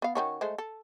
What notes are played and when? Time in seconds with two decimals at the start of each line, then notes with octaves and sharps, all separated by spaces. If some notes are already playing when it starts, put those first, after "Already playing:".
0.02 B3 F5
0.15 D#3 C#4 F#4
0.41 G#3 A3 C5
0.58 A4